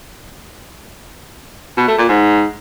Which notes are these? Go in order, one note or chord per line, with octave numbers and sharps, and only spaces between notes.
B2
A3
A#2
G#2